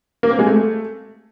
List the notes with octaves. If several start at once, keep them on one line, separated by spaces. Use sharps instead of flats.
A#3
C4
G#3
A3